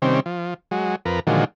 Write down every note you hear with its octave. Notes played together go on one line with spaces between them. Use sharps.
C3 D#3 G3 C4 C#4
F3
F#3 G#3
F2 A#4 B4
A#2 D3 D#3 F3 F#3 G#3